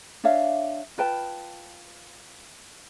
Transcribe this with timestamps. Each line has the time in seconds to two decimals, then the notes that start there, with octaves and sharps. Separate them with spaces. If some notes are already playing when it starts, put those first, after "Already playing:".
0.24 D4 C#5 E5 F5
0.98 F4 B4 G5 A5